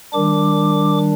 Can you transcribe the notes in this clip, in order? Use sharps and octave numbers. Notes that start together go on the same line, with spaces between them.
D#3 G3 D4 D6